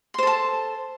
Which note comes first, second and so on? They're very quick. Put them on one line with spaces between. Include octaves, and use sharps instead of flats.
C6 C5 A4 A5